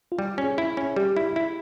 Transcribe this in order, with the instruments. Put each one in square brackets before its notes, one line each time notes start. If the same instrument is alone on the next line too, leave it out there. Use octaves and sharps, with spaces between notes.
[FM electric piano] F4
[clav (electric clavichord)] G3 [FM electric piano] G4
[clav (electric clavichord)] C#4
[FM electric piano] G#4
[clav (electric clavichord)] E4
C#4
[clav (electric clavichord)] G3 [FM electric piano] G4
[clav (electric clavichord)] E4
E4